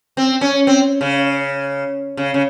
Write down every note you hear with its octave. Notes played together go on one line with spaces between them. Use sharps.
C4
C#4
C4
C#3
C#3
C#3